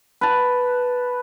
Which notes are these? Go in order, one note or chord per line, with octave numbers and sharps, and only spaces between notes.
B4 A5